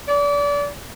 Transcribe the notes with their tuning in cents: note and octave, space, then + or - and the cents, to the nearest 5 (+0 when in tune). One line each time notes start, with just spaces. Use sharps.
D5 -30